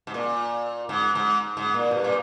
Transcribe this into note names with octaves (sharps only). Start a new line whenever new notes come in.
G#2
A#2
G#2
G#2
G#2
A#2
G2
A#2